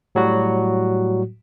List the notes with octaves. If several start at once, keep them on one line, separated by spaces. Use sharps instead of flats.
A2 F#3 G3 F#4